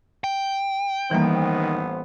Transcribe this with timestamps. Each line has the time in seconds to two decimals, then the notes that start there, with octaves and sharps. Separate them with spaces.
0.24 G5
1.11 A1 D#3 E3 G3 A#3 B3 C5